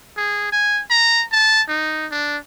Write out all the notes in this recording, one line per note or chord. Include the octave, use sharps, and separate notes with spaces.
G#4
G#5
A#5
A5
D#4
D4